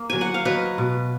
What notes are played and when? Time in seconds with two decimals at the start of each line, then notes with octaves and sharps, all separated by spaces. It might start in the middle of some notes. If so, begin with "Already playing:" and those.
Already playing: A#3
0.10 F#3 G#5
0.21 F#5
0.34 F5
0.45 F#3 B4 D#5
0.78 B2